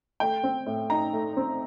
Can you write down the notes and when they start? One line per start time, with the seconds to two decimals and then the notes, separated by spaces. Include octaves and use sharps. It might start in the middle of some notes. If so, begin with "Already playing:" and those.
0.20 A3 G5
0.43 C4
0.66 A2
0.90 D#4 A#5
1.13 A3
1.37 C4